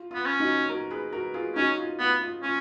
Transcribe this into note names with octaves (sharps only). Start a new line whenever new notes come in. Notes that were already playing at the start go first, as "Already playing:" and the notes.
Already playing: F4
B3 F4
C#4
D#4 F#4
F#4 A#4
G#4 B4
F#4 A#4
F4 G#4
C#4 D#4 F#4
F4
B3 F4
F4
C#4 F4